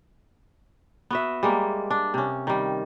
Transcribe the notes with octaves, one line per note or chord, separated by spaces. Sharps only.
B3 F#4 E5
G3 G#3 A#3
D4
C3 C#4
D#3 G3